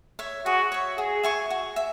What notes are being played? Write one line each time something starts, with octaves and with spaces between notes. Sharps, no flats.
C#5 E5
F#4 G#4
C#5 E5
F#4 G#4
E5 G#5 C#6
F#4
E5